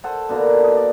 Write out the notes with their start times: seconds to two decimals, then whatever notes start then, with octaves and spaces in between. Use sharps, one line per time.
0.04 A4 C5 F#5 G#5
0.29 B2 D3 A#3 A#5
0.64 D#5
0.77 D5